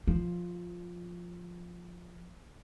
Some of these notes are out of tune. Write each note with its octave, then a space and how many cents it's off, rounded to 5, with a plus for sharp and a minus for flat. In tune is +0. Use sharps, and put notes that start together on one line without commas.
F3 +5